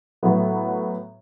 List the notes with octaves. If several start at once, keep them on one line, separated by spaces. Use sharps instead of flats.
A2 F#3 B3 F#4